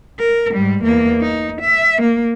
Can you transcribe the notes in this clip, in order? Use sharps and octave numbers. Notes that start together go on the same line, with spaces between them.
A#4
G#2 G3
E2 A#3
D#4
E5
A#3